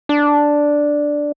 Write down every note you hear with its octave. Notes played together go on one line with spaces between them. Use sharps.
D4